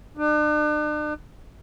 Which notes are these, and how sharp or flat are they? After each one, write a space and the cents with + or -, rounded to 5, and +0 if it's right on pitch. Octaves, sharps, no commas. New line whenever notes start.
D4 +40